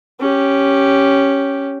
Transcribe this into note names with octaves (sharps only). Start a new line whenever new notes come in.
C#4 G4